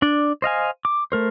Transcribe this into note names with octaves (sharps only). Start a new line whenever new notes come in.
D4 D5
C5 D#5 F5 G#5
D6
A3 A#4 C5